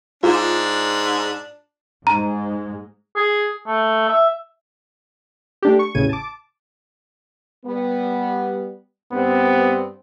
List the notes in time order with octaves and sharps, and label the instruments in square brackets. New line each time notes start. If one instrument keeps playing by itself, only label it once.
[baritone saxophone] G#2 [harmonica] D4 [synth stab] F4
[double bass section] G#2 G#3 [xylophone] A#5
[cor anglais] G#4
A3
E5
[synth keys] A3 D4 G4
C#6
A1 E2 C#3 G#6 D#7
A5 D6
[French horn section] G3 B3
[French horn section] G2 C4 [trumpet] B3